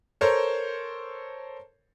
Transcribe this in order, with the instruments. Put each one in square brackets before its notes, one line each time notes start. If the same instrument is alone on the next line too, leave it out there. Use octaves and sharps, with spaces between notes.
[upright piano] A4 A#4 C5 C#5